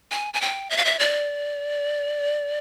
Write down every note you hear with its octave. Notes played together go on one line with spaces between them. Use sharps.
G#5
G#5
G5
E5
F5
E5
D5